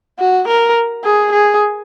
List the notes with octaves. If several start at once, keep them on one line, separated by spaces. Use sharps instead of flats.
F#4
A#4
G#4
G#4